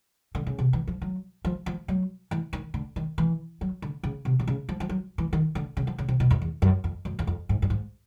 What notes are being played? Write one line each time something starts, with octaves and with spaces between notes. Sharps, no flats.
D3
C#3
C3
E3
F3
F#3
F3
F3
F#3
E3
D#3
D3
D#3
E3
F#3
D3
C#3
C3
C3
C#3
F3
F3
F#3
E3
D#3
D3
C#3
F3
C#3
C3
B2
F2
E2
F#2
F2
F#2
E2
F2
G#2
G2
G#2